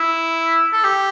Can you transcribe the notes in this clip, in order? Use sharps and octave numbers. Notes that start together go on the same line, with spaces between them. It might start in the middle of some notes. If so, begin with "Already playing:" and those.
Already playing: E4
A4
G4